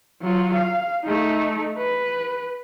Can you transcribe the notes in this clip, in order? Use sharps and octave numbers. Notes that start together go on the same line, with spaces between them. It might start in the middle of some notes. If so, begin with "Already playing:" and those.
F#3 F4
F5
A3 D#4
B4